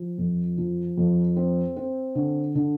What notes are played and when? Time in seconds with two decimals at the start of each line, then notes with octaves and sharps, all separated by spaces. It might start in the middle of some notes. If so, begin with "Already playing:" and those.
Already playing: F3
0.18 F2
0.58 F3
0.97 F2
1.36 C4
1.76 C4
2.15 D3
2.55 D3